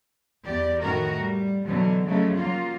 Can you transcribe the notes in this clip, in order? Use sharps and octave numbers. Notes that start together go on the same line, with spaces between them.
E2 G4 D5
F2 A2 D#3 F#4 A#4
G3
B2 D3 E3 F#3
C#3 F3 F#3 G#3 A3
F#3 A#3 F4